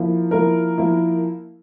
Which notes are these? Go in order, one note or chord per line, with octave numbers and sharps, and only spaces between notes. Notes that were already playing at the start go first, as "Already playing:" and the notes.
Already playing: F3 A#3 E4
F3 A#3 E4 A#4
F3 A#3 E4